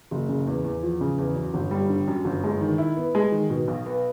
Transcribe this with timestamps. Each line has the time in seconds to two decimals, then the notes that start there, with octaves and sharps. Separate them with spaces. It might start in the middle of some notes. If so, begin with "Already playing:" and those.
0.11 F#1
0.29 C#3
0.47 E2
0.64 E2
0.83 F3
1.01 C#3
1.18 E2
1.36 F#2
1.54 G1
1.71 G3
1.90 D3
2.07 F#2
2.25 G1
2.44 G#3
2.61 D#3
2.78 E4
2.97 B3
3.15 G#3
3.32 D#3
3.50 B2
3.68 B1
3.86 B3